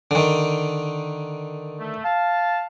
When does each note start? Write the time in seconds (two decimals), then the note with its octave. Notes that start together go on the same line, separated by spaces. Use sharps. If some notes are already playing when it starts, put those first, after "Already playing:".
0.11 D3 D#3
1.79 A3
2.04 F5 A5